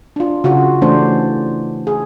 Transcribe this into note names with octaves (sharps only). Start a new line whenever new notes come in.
D4 F4
C#3 F4 F#4
E3 A3 C#4 D4 C5
G#4